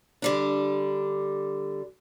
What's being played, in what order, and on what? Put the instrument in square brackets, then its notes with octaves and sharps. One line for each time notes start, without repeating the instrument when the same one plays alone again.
[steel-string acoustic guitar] D3 G3 D4